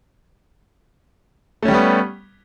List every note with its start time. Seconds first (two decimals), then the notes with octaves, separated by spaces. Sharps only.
1.63 A3
1.65 C#4
1.68 G3
1.71 G4
1.74 B3